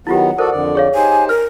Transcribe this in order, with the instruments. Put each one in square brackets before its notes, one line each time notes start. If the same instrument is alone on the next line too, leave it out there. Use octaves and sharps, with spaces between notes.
[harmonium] D#3 F#3 B3 [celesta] E4 F4 G4 [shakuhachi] F#5
[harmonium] F#4 A4 D5 [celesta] A#4 C5
[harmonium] F2 D3 D5
[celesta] G#4 C#5 F5
[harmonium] D#4 G4 C5 [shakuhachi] G#5
[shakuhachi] A#4 [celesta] F6